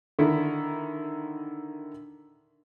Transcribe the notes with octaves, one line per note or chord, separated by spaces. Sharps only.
D3 D#3 E4